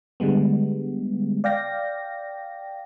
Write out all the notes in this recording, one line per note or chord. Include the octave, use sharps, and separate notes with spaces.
D3 G3 G#3 B3
D5 F5 G5 A#6